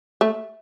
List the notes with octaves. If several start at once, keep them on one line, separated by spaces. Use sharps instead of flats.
A3